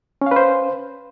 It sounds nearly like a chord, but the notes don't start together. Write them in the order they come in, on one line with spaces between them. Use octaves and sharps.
C#4 F5 B4 C5